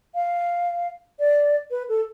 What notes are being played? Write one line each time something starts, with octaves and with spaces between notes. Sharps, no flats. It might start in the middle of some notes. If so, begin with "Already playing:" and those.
F5
D5
B4
A4